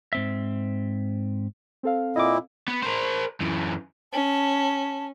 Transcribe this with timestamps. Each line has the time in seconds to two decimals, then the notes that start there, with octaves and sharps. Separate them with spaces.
0.13 G#2 C4 E5
1.83 C4 A4 F5
2.16 A#2 E4 D#5 D6
2.68 B3
2.83 A#4 C5
3.40 F#2 E3
4.13 C#4 A5